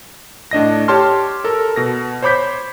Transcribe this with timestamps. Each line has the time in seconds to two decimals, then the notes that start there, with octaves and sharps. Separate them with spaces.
0.51 A2 D4 D#5 A#6
0.88 G4 C#5 A5 C6 F6
1.44 A4 A#4
1.76 B2 A#6
2.23 C5 C#5 B5 D6 G6 B6